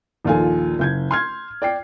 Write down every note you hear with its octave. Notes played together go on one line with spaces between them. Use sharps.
A#1 D#2 A#3 F4 A4 G#5
F#1 G6 G#6
C6 F6 G#6
D5 G5 C7